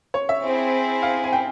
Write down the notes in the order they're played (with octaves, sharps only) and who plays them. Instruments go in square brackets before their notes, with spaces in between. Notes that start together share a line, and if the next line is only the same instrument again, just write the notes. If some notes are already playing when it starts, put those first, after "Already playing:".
[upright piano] C#5
E5
[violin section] C4 E4 G#4
[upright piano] F5
G#5
G5